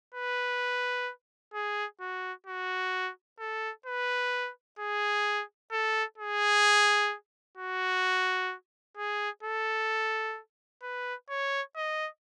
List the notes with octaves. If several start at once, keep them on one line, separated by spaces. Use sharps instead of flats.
B4
G#4
F#4
F#4
A4
B4
G#4
A4
G#4
F#4
G#4
A4
B4
C#5
D#5